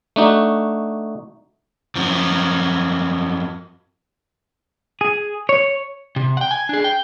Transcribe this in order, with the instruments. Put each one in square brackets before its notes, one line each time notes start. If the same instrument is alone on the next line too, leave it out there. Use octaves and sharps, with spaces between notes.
[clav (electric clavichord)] A3 D4 D#4 F#4
[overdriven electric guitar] F#2 F3
[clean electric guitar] G#4
C#5
[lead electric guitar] C3
F#5 G5
G#5
D4 G#4
G5